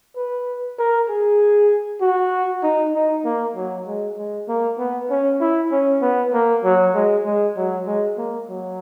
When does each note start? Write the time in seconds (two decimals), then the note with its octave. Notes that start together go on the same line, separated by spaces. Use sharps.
0.16 B4
0.79 A#4
1.09 G#4
2.01 F#4
2.63 D#4
2.94 D#4
3.25 A#3
3.56 F#3
3.86 G#3
4.17 G#3
4.48 A#3
4.78 B3
5.10 C#4
5.40 E4
5.71 C#4
6.01 B3
6.33 A#3
6.64 F#3
6.95 G#3
7.26 G#3
7.57 F#3
7.87 G#3
8.17 A#3
8.49 F#3